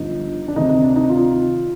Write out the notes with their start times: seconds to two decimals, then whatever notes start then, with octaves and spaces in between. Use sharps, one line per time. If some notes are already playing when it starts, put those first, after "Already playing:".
Already playing: G1 G2 F3 D#4
0.48 D4
0.56 D2 C3 D#3 D#4
0.69 D#4
0.83 D4
0.96 D#4
1.10 F4